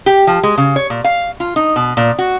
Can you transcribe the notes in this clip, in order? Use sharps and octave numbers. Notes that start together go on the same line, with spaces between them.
G4
F3
G#3
C#3
C#5
A#2
F5
F4
D#4
B2
A#2
F#4